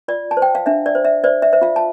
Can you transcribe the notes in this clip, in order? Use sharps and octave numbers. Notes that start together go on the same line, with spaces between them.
F4 D5
A5
C5
G5
F5
D4 E5
D5
C5
E5
C5 D5
E5
C5 E5
F4 F5
A5